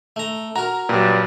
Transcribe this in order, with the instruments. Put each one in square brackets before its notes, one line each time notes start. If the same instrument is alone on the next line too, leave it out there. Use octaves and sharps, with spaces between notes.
[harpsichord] A3 A#5
[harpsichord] F#4 A#4 [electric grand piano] A#5
[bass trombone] G2 [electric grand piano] A#2 F#3